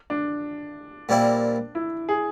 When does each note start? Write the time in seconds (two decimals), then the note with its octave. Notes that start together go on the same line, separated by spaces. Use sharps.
0.10 D4
1.09 A#2 G3 C4 E4
1.75 E4
2.09 G#4